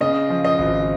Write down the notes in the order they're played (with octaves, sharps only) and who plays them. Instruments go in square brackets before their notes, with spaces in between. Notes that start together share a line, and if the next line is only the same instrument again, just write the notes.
[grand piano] C#3 [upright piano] D#5
[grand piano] F3
[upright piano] D#5
[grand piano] G#1